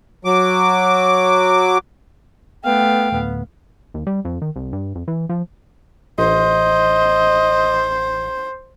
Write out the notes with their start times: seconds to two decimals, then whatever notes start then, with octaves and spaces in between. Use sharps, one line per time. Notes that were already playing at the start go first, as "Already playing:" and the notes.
0.25 F#3 D6
2.64 A3 B3 F5 G5
3.12 D1 B3
3.94 D#2
4.07 G3
4.25 F2
4.42 D#3
4.56 C2
4.73 G2
4.95 F2
5.08 E3
5.29 F3
6.18 A1 C5 D#5